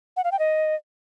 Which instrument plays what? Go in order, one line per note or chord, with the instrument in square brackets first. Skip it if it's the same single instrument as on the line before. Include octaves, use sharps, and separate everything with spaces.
[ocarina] F#5
F5
G5
D#5